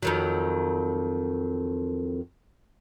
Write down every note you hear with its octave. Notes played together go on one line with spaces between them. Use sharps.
F2 D#3 F#3